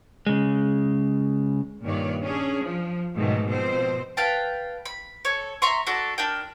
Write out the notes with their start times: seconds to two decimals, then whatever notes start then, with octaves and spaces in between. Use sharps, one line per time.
0.27 C#3 G#3
1.83 G2 A#2 D#3 C#5 D5
2.21 C#4 D4 G#4
2.61 F3
3.16 G#2 B2 D#3 F#3 A3
3.46 B2 F3 C4 C5
4.17 B4 F5 G5 A5
4.85 B5
5.25 A4 C#5
5.62 E5 A#5 C6 C#6
5.87 D4 F#4 A4
6.18 D4 A#4 G5